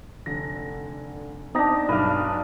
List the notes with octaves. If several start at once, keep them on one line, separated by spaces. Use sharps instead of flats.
F1 D3 A#6
C4 D4 D#4 A#6
B1 G2 B4 F5